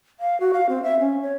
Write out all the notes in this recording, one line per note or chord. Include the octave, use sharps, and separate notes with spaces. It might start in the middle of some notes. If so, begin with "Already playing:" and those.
F5
F#4
F5
C4
E5
C#4
C#5